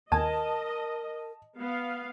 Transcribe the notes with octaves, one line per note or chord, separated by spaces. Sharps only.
D#2 A#4 D#5 G#5 A5
B3 F5